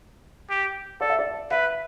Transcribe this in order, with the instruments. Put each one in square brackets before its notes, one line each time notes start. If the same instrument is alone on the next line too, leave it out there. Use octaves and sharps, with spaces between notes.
[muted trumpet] G4
[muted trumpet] A4 [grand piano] D5
[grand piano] E5
D5
[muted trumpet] B4 [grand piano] E5